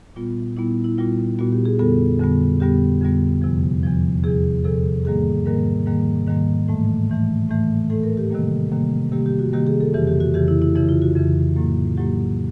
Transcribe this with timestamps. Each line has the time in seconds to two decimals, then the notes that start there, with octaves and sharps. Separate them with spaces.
0.16 A#2 G3 B3 F4
0.57 A#2 G3 B3 E4
0.84 E4
0.98 A#2 G3 B3 F4
1.39 A#2 G3 B3 F#4
1.52 G4
1.65 G#4
1.79 F2 D3 G3 B3 A4
2.20 F2 D3 G3 B3
2.60 F2 D3 G3 B3 G4
3.02 F2 D3 G3 B3
3.42 E2 C3 F3
3.83 E2 C3 F3
4.24 E2 C3 F3 G#4
4.64 E2 C3 F3 A4
5.05 G#2 D#3 G3 A#3 G#4
5.46 G#2 D#3 G3 A#3 A#4
5.86 G#2 D#3 G3 A#3
6.27 G#2 D#3 G3 A#3
6.68 A2 E3 A3
7.09 A2 E3 A3
7.49 A2 E3 A3
7.90 A2 E3 A3 A4
8.03 A#4
8.17 G4
8.31 C3 D#3 G3 A#3
8.71 C3 D#3 G3 A#3
9.12 C3 D#3 G3 A#3 G4
9.26 G4
9.39 F#4
9.53 C3 D#3 G3 A#3 G4
9.67 G#4
9.81 A4
9.94 F2 C#3 E3 G4
10.07 G4
10.20 F#4
10.34 F2 C#3 E3 G4
10.48 E4
10.62 E4
10.75 F2 C#3 E3 E4
10.89 F4
11.02 F#4
11.16 F2 C#3 E3
11.56 A2 F#3 A#3
11.97 A2 F#3 A#3 G4